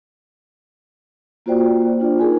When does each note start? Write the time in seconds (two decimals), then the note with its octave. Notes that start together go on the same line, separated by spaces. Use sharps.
1.46 A#3 F4 F#4 C5 D5 G5
2.00 D4 F4 D5
2.19 D#4 F4 G#4 A#4 C5 G#5